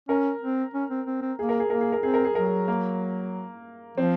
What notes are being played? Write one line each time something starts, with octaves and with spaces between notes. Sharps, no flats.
C#4 A#4
C4
C#4
C4
C4
C4
A#3 G#4
A#4
G#4
A#3 A#4
G#4
A#4
C4 G#4
A#4
G#4
F#3 A#4
G#4
A#3
F3 C4